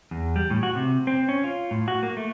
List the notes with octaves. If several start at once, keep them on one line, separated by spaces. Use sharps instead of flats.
E2
G3
A2
F#4
C3
C4
C#4
F4
A2
F#4
A#3
A3